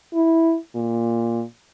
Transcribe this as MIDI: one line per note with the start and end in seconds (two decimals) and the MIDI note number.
0.13 0.56 64
0.75 1.43 46